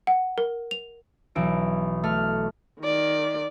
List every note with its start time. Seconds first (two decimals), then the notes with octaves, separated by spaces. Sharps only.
0.07 F#5
0.38 A#4
0.71 F7
1.35 B1 E3 E4 D7
2.04 A3 F6
2.79 D#3 D5